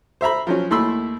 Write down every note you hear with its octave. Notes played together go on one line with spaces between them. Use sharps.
C5 E5 A#5 B5
F3 F#3 C#4
D#2 A3 E4 B5 C6 E6